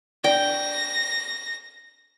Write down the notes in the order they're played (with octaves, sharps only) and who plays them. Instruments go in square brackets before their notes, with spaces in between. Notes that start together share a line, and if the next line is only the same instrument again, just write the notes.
[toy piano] D4 D5 [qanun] G5 [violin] A#6